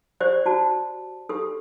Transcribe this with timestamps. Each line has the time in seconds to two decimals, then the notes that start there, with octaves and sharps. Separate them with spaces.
0.20 G4 C5 D5
0.46 F#4 A5
1.29 G4 A4